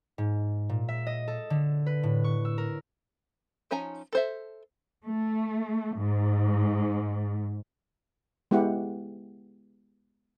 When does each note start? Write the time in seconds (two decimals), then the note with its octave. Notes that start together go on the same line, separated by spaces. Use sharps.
0.18 G#2
0.69 A#2
0.88 E5
1.06 D#5
1.28 A4
1.50 D3
1.86 B4
2.03 A2
2.24 C#6
2.45 E6
2.58 A#4
3.71 F3 C#4 D#4 G#5 A#5
4.13 A4 C5 E5
5.06 A3
5.96 G#2
8.51 G#3 B3 E4 G4 F#5